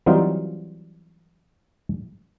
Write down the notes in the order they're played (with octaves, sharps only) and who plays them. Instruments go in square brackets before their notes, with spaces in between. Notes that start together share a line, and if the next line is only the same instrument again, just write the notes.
[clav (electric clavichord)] E3 F#3 G3 C4 D#4 F4